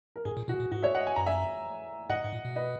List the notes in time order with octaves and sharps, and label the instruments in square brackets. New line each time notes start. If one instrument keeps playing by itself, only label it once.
[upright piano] A#4
[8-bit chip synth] G#2 [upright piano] G#4
[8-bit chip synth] A#2
[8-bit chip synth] B2 [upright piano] F#4
[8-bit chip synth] A#2
[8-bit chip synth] G#2 [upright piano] F#4
[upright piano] C#5 E5
D#5 F#5
G#5
[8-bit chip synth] F#2 [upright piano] A#5
[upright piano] E5 G#5
[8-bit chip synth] G#2 [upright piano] D#5 F#5
[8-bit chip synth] G#2
A#2
B2
[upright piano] B4 D#5